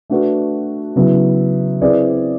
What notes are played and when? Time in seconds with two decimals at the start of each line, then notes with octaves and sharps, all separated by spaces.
0.10 A3 D4 F#4 B4
0.96 C#3 F#3 B3 E4
1.81 C4 E4 G#4 B4 D5